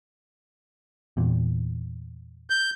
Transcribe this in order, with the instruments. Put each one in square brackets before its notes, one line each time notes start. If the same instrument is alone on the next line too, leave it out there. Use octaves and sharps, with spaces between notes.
[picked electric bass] E2 A#2
[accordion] G6